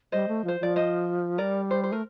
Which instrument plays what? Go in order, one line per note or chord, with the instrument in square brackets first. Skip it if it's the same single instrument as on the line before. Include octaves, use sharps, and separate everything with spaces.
[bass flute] G3 [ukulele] C5 D#5
[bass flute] A3
[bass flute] F3 [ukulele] C5
[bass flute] F3 [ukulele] D5
[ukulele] C5 D#5
[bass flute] G3 [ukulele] A#4 D5
[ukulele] C5
C5
[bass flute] A3 [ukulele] A#4